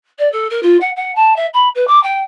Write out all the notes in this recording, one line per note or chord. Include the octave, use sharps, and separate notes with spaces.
D5
A4
A#4
F4
F#5
F#5
A5
E5
B5
B4
D6
G5